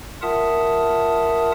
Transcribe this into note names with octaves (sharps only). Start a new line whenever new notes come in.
F4 A#4 E5 F#5 A5 D#6